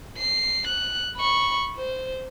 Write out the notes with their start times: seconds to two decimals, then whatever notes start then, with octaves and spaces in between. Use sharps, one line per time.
0.17 C7
0.67 F#6
1.17 B5 C#6
1.76 C5